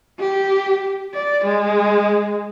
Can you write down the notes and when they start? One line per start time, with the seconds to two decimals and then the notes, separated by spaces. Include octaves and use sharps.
0.20 G4
1.14 D5
1.44 G#3